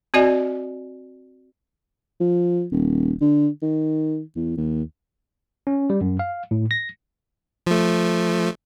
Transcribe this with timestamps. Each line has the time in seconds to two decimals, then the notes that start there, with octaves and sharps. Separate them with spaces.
0.14 C4 F#4 D5 D#5 G#5
2.20 F3
2.71 D#1
3.21 D3
3.62 D#3
4.36 E2
4.57 D#2
5.67 C#4
5.90 G3
6.01 F#2
6.19 F5
6.51 A2
6.71 A#6
7.67 F3 A3